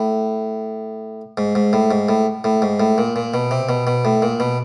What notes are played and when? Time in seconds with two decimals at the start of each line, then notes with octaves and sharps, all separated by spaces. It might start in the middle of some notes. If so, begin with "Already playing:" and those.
Already playing: A2
1.37 G#2
1.55 G#2
1.73 A2
1.91 G#2
2.09 A2
2.44 A2
2.62 G#2
2.80 A2
2.98 A#2
3.16 A#2
3.34 B2
3.51 C3
3.69 B2
3.87 B2
4.05 A2
4.22 A#2
4.40 B2